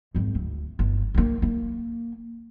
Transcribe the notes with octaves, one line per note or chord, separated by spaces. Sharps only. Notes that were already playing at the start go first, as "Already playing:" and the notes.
G#1 F2
D2
G1
D#3 A#3
A#3